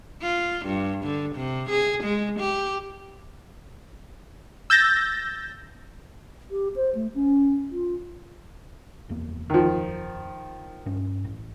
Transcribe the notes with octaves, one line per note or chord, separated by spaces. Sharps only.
F4
G2
D3
C3
G#4
G#3
G4
E6 G6 A6 A#6
G4
C5
A3
C#4
F4
F#1 E2 A#3
D#3 F3
G2 C#4
A1